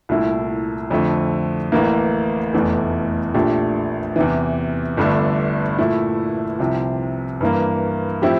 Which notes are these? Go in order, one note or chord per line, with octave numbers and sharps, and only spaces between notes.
C2 A#2 A3 E4
F2 D3 F3 A3
A1 A2 E3 A#3
F1 E2 E3 A3
A#1 A#2 A3 D4 G4
E2 C3 E3
G1 G2 D3 A3 D4
A#2 A3 E4
C2 C3 F3
G2 E3 A#3
A2 F3 C4 E4 G4